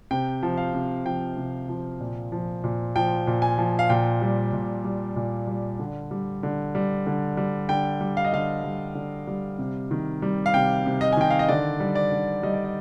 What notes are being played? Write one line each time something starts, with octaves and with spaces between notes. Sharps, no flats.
C3 G5
F3
F5
C3
F3 G5
C3
F3
A#2
F3
A#2
F3 G5
A#2
G#5
F3
F5
A#2 G5
G3
A#2
G3
A#2
G3
D3
G3
D3
G3
D3
G3
D3 G5
G3
F5
D#5
D3 F5
G3
D3
G3
C3
D#3
G3
F5
C3 G5
C3
D#5
G#5
D#3 G5
F5
D#5
D3 D5
G3
D5
D3
G3 D#5
D5
D#5